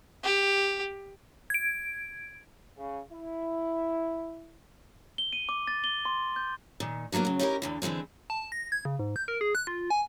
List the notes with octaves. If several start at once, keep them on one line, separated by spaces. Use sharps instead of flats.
G4
G#6 D7
C#3
E4
G7
D#7
D6
A6
G7
C6
G6
A#2 D#3
D3 F#3 G3 A#3 B3
C#3 F#3
C#4 D#4 E4 G4 G#4 A#4
E2 D3 E3
D3 E3 F#3 G#3 C4
A5
A#6
G#6
C#3
G#2
G6
A#4
G#4
F#6
F4
G#5